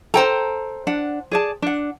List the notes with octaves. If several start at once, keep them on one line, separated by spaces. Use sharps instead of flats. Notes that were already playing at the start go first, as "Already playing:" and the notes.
A4 C5 G5 A#5
D4 F#5
G#4 D5 A5
D4 F#5